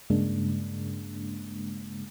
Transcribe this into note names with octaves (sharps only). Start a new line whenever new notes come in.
G2 C#3 G#3 A#3 D4